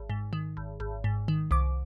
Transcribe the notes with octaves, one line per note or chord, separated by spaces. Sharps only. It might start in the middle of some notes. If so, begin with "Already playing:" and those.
Already playing: G#1
G#2
D#3
G#1
G#1
G#2
D#3
C2 D6